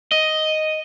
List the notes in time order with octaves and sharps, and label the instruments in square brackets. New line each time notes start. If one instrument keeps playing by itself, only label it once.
[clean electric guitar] D#5